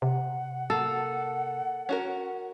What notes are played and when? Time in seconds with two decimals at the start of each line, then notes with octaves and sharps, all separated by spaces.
0.02 C3 F#5
0.70 A#3 A4
1.89 C#4 F#4 A#4